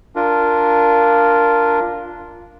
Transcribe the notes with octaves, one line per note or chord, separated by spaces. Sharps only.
D4 F4 A#4